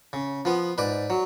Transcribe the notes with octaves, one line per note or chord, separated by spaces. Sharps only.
C#3
F3 B3
G#2 B4 D5
F#3